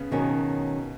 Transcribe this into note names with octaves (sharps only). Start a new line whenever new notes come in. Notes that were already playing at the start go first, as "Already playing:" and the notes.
Already playing: C#3 B3
B2 D#3 F#3 C#4